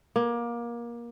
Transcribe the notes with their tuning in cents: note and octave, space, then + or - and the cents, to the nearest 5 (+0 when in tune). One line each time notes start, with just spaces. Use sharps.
A#3 +25